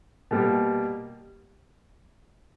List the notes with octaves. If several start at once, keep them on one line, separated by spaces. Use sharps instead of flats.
B2 G3 A#3